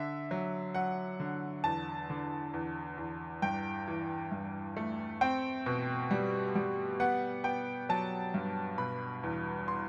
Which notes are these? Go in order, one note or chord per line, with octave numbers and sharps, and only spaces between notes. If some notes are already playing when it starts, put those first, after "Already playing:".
Already playing: D3 E5
F#3
F#3 F#5
D3
E2 A5
D3
E2
E2
G2 G5
E3
G2
A3
C4 G5
B2
G3
G3
B3 F#5
B3 G5
F#3 A5
G2
B2 B5
E2
C6